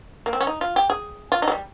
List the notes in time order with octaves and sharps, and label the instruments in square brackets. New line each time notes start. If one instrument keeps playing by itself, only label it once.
[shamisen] A#3
C4
C#4
D#4
F4
G4
G#4
F4
D#4
G#3
G3